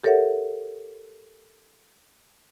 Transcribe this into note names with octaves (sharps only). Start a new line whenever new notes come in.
G4 A4 A#4 C#5 E5 F#5